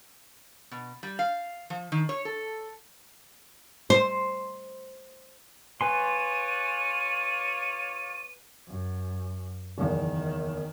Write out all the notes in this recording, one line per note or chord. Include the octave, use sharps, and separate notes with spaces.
B2
G3
F5
F3
D#3
C#5
A4
C5
F4 B4 C#5 D5 G#5 C6 D#7
F#2
F#1 E2 D#3